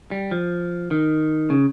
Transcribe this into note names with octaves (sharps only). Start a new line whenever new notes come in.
G3
F3
D#3
C#3